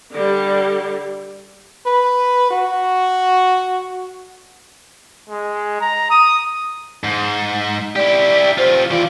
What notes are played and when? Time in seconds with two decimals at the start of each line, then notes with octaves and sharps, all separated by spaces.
0.12 D3 G3
1.86 B4
2.50 F#4
5.29 G#3
5.81 A#5
6.10 D#6
7.04 G#2
7.96 E4 G4 D5
8.58 F4 G4 C5
8.91 E3 F4 D5